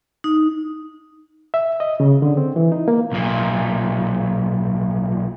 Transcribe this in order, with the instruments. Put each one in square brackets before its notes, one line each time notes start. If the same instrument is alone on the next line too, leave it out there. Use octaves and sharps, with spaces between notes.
[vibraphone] D#4
[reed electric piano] E5
D#5
C#3
D3
C4
E3
D#4
A#3
[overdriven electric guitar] B1 A#2